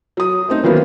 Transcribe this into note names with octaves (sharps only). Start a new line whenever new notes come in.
F#3 D#6
A3 C4 D#4
D#3 E3 F#3 A#3 B3